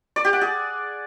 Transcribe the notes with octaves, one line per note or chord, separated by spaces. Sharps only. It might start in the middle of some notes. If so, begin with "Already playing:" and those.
D5
G4
F#5
G#4